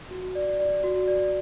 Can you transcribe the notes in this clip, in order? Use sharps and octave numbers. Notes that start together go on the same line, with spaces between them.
F#4
D5
D5
F#4
D5